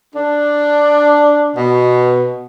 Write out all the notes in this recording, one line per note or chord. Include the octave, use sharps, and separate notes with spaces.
D4
B2